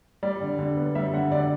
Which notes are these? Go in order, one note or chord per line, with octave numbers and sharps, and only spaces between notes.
G3 D5
D3
D3
B3
G3 E5
D3 F#5
D3 D5